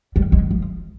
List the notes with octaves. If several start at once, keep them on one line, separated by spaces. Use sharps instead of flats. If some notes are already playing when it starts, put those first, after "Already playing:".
G3
G#3
F3